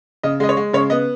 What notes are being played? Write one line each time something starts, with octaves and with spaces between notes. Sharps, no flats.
C#3 D#5
G#3 D#5
C#5
G#3
C#3 C#5
B3 D#5